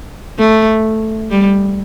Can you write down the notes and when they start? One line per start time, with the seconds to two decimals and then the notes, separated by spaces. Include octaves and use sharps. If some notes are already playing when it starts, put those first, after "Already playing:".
0.39 A3
1.30 G3